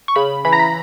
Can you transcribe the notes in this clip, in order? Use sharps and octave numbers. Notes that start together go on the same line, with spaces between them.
C#6
C#3 B5
E3 B5
A#5
B5